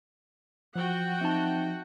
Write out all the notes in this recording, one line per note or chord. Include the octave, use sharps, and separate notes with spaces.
F3 F#4 F#5 G5
C4 D#4 E5 A5